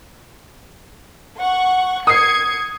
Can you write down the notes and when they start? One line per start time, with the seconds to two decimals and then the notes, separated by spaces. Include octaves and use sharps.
1.40 F#5 C#6
2.07 D#6 G#6 C7 C#7